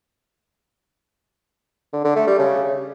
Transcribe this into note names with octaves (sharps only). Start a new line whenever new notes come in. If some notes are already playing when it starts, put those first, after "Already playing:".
D3
D3
A3
G3
C#3